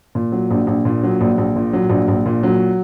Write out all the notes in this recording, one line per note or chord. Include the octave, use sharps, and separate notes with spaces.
A#2
F#3
A#1
A#1
A#2
F#3
A#1
A#1
A#2
F#3
A#1
A#1
A#2
F#3